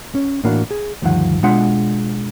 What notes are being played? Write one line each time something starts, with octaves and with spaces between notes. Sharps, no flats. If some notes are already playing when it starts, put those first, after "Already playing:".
C#4
A2 E3 A#3 D4 F#4
G#4
D2 G2 D#3 F3 F#5
B2 G#3 D4 F4 F#5 C6